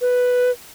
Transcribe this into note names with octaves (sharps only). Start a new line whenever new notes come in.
B4